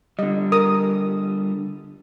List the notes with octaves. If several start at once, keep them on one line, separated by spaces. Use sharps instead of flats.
D3 G3 D#5
A#4 D#6